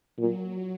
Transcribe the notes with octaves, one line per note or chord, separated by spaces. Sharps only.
A#2 F#3